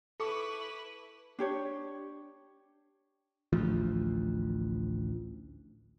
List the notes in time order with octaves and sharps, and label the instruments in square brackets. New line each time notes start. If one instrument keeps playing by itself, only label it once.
[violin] E4 B4 [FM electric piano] A4 [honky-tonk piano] C#6 D6 C#7
[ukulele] D4 G4 C#5
[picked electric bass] A1 D2 F3